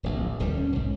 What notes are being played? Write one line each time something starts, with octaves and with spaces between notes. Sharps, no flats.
D1 A#1
D#1 D2 F3 G3
C#4
B1 G#2